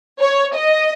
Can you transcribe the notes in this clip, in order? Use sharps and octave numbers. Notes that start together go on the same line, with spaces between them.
C#5
D#5